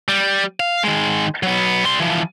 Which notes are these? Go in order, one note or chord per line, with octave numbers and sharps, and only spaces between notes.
G3
F5
D#3 G#3
F#3 B3
G3 C6
E3 F3